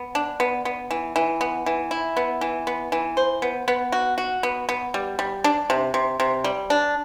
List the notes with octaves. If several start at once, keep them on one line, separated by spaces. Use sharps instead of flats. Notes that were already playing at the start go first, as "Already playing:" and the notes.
Already playing: B3
D4
B3
B3
E3
E3
B3
E3
E4
B3
E3
B3
E3
C5
B3
B3
F#4
F#4
B3
B3
G3
G3
D4
C3
C3
C3
G3
D4